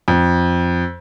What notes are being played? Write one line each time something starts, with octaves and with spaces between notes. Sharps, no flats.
F2